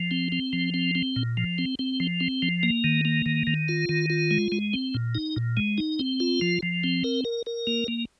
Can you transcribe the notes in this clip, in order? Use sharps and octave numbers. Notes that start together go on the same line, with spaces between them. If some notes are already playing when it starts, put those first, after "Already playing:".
Already playing: F3
C4
C4
F3
C4
C4
A#2
F3
C4
C4
F3
C4
F3
A#3
D#3
A#3
D#3
D#3
F4
D#3
F4
G#3
G#3
C4
A#2
D#4
A#2
G#3
D#4
C4
F4
F3
F3
C4
A#4
A#4
A#4
A#3
A#3